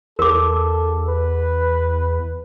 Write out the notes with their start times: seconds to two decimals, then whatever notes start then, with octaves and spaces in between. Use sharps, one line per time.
0.19 E2 A4 A#4 D6
1.08 B4